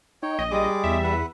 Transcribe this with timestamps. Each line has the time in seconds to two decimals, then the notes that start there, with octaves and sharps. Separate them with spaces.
0.23 D#4 C#5 G5
0.39 A#1 D#5
0.51 G3 G#3 G#4 D6
0.84 E2 E5
1.04 B4 F#5